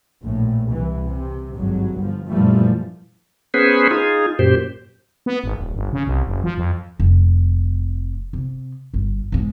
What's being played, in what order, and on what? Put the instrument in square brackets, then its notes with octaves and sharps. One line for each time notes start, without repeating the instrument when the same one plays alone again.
[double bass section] A#1 A2
C2 E3
C3
G#1 G2 F#3
G1 F3
F#2 A#2 E3 F3 G3 A3
[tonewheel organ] B3 C#4 G#4 B4 C5
D#4 F4 G#4
F#2 A#2 G4 C5
[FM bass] B3
G#1
D#1
G1
C#3
C2
F#1
F3
F2
[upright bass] F1
C3
G1
G#2 G#3